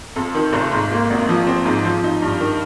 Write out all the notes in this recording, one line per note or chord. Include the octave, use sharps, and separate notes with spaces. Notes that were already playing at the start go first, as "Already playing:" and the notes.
F2
D#3
F1
G#2
A#3
G#1
F3
C4
G#2
F3
D#4
G2
D#3